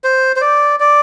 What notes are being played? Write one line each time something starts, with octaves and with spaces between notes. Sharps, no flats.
C5
C5
D5
D5